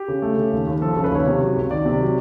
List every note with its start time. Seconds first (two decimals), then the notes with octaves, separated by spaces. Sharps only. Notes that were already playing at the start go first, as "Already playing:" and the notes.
Already playing: G4
0.08 C#3
0.22 A3
0.37 C#3
0.52 D#2
0.67 D#2
0.81 F3 A4
0.93 C#3 A4
1.04 B4
1.11 D#2 C#5
1.26 C3
1.42 F#3
1.56 C#2
1.70 D#3 D5
1.85 C3
2.00 F#3